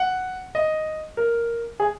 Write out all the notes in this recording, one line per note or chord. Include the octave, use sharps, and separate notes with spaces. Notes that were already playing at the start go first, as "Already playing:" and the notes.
Already playing: F#5
D#5
A#4
G#4